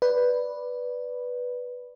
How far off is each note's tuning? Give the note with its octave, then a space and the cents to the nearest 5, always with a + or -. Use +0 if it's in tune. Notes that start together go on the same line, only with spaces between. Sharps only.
B4 +0 D5 +0